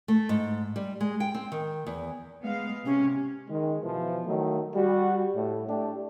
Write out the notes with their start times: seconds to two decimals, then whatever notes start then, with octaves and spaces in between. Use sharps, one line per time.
0.08 A3
0.29 G#2
0.76 G3
1.01 G#3
1.20 G5
1.35 C4
1.52 D#3
1.87 E2
2.43 G#3 B3 F5
2.85 C3 C#4
3.49 D#3 G#3
3.83 B2 E3 F3
4.26 D#3 F#3 A3 D#4
4.75 G3 F#4
5.35 A2
5.68 A3 D4 G4